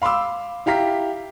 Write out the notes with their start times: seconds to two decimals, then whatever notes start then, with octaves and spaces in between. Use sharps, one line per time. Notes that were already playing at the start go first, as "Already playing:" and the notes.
0.02 F5 B5 C6 D6 E6
0.66 E4 G4 F5 A#5 B6